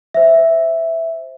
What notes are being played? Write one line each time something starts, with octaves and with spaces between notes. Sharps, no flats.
C5 E5